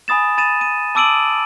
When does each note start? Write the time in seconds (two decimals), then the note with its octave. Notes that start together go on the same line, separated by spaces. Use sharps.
0.08 G#5 B5 D#6 A6 E7
0.38 B5 A6 D#7 E7
0.61 D#7
0.95 A5 D6 E6 D7 D#7 F#7